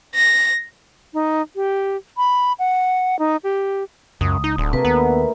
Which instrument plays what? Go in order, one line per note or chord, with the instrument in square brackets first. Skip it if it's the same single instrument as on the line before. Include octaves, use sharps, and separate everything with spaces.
[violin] A#6
[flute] D#4
G4
B5
F#5
D#4
G4
[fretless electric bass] C#2 [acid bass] F#2 [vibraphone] D#6
[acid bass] D#4
[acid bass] D1 [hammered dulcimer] D3 G#3 D#4
[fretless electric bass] C3 [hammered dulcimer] A3 A#3 F#4 [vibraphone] B4
[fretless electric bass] D#2 [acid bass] B3 [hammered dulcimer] E4